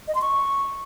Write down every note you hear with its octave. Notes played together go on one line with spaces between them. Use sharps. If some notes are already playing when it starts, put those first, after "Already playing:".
D#5
C6
C#6